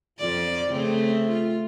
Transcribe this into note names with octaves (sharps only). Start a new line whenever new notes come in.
F2 F4 D5
C#3 A3 C4
F4